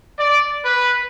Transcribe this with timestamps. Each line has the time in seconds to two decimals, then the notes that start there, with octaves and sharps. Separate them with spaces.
0.19 D5
0.64 B4